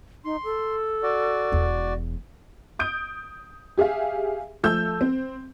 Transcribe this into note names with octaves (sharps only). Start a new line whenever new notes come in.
D#4 C6
A4
F#4 D5
E1 E2
D#6 G6 D7
G4 G#4 E5 F5
F3 A3 A4 E6 G6
C4